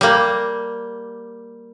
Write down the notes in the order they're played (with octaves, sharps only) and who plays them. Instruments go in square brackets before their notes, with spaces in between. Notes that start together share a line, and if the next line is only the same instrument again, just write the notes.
[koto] G3 A#3